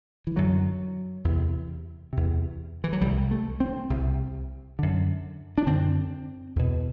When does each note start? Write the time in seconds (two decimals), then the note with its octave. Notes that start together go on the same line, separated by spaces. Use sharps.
0.27 E3
0.36 F#2 D3 F#3
1.24 E2 C3
2.13 E2 C3
2.84 E3
2.93 F#3
3.01 C2 C3 G3
3.31 A3
3.60 C4
3.90 C2 C3
4.79 F#2 D3
5.58 D4
5.67 F#2 D3 C4
6.56 E2 B2